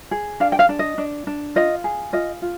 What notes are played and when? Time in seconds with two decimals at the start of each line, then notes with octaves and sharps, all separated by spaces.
0.11 G#4
0.40 D4 F5
0.52 G5
0.59 F5
0.69 D4
0.79 D#5
0.98 D4
1.27 D4
1.56 F4 D#5
1.84 G#4
2.13 F4 D#5
2.42 F4